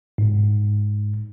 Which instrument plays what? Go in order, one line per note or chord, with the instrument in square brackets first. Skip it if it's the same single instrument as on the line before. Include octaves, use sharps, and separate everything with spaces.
[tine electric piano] G#2